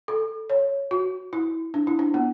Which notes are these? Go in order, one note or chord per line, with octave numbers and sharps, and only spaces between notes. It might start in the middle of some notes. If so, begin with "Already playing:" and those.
A4
C#5
F#4
E4
D4
E4
D4
B3